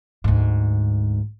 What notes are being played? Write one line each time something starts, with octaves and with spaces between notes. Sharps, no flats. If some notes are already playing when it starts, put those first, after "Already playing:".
D2 G#2